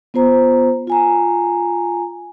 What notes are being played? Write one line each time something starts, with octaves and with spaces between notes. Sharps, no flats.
B3 F4 C5 A#5
F4 G#5 A#5